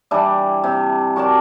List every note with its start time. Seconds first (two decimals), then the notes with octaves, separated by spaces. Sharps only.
0.11 E3 G3 D4 E4
0.64 C3
1.16 F#4 A#4 D5 A5